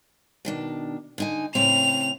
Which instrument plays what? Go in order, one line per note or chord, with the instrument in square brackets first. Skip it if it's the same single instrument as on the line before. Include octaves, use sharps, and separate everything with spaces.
[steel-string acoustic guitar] B2 D#3 D4
D3 D#4 G#5
[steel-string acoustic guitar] A2 C#3 C4 [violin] F7